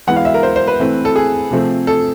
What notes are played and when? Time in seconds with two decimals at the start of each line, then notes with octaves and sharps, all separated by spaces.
0.07 E3 G#3 B3 F#5
0.16 F5
0.25 E5
0.34 A#4
0.43 C5
0.56 C5
0.68 B4
0.80 E3 A3 C4
1.05 A4
1.16 G#4
1.51 C3 F3 A3 C4
1.87 A4